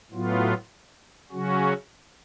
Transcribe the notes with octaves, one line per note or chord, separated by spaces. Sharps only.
A2 F#3 B3 F4
C#3 F#3 C#4 F#4